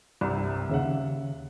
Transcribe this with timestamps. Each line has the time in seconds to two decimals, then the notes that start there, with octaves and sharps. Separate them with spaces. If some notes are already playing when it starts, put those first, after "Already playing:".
0.21 C2 G2 C3
0.69 D#2 C#3 E5 F#5